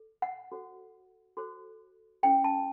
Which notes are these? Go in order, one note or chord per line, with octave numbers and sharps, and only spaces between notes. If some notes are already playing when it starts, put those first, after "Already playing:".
Already playing: A4
F#5
F#4 A4 C5
F#4 A4 C5
C#4 E4 A4 C5 G5
A5